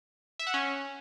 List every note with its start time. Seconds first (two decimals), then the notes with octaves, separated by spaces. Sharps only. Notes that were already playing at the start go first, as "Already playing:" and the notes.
0.39 E5
0.47 F#5
0.54 C#4